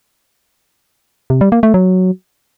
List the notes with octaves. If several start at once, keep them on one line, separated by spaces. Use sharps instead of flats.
C3
G3
A#3
A3
F#3